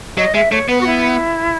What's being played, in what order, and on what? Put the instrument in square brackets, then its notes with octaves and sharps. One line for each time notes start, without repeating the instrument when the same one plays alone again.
[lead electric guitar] F#3 [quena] D#5
[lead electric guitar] G#3 [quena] E5
[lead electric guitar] A3 [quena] C#5
[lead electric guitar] B3 [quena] B4
[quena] F#4
E4